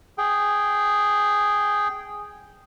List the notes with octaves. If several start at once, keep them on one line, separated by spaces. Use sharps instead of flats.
G#4 G5